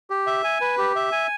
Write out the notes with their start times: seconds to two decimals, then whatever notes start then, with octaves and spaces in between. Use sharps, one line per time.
0.10 G4
0.27 E5
0.44 G#5
0.61 B4
0.78 G4
0.96 E5
1.12 G#5